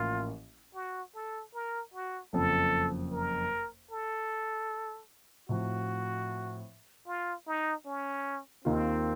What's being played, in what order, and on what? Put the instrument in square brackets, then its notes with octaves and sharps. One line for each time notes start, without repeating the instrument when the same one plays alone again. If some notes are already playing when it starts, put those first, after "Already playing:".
Already playing: [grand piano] A1 A2 F3 A#3 C#4 [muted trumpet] F4
[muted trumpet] F#4
A4
A#4
F#4
[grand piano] F#1 F2 C#3 [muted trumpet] A4
[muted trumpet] A#4
A4
[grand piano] A2 F3 C4 [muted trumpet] F#4
[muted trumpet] F4
D#4
C#4
[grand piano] D#2 D#3 A#3 F4 [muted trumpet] C4